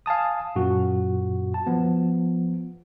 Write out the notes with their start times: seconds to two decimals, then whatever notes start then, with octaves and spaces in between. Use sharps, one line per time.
0.06 F5 G#5 A5 D#6
0.56 F#2 A#2 F#4
1.54 A5
1.67 F3 B3